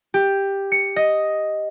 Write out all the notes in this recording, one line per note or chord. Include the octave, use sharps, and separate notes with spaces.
G4
C#7
D#5